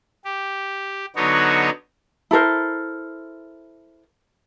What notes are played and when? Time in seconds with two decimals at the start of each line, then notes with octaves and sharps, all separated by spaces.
0.25 G4
1.16 D3 F#3 B3 D#4 F#4 C#5
2.31 E4 A4 A#4 C5